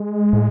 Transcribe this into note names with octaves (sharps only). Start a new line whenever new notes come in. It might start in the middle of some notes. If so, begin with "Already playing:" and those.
Already playing: G#3
A2